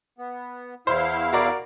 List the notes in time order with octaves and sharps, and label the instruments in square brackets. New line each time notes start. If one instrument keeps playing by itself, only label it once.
[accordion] B3
[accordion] E2 E4 F5 [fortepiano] C5
[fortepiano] F#4 A#4 D5